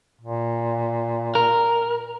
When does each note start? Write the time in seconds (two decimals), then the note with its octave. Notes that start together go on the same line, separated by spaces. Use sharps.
0.21 A#2
1.35 A#4